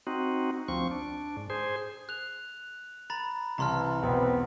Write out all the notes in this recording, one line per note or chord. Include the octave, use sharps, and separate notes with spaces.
C4 D#4 F#4
D2 F3 C4 C#6
D4
G#2
G#4 C5
F#6 F7
A#5 B5 A6
C2 E3 A5 A#5 C6 F6
E1 B1 E2 B3 C4